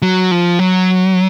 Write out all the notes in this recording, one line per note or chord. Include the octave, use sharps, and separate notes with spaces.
F#3
F3
F#3